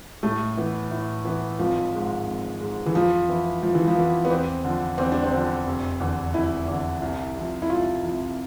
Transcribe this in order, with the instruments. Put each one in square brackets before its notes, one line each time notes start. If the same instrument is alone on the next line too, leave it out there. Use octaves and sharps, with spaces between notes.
[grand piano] A2 [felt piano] A3
[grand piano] E3 B3
A2
E3 B3
[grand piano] G#1 [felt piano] F3
[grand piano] G#2 G#3
G#1
G#2 G#3
[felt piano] E3
[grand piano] F2 [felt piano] F3
[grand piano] E3 B3 E4
[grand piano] F2 [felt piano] F3
[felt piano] E3
F3
[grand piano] E3 B3 E4
[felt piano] B3
[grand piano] E2 [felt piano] C4
[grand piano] D3 F3
[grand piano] E2 [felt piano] C4
[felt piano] D4
C4
[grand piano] D3 F3
F1
E2 D3
[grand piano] F1 [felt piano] E4
[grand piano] E2 D3
C2
C3 F3
[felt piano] E4
[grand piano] C2 [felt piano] F4
[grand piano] C3 F3